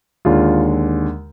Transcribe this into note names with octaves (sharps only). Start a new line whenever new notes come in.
D#2 D3 G#3 F4